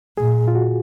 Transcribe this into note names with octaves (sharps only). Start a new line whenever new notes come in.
A#2 G#4
F4
F#4